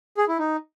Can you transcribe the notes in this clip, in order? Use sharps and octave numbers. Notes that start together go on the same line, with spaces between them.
G#4
E4
D#4